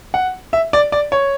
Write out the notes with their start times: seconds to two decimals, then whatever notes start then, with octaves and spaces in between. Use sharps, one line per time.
0.14 F#5
0.53 E5
0.73 D5
0.92 D5
1.12 C#5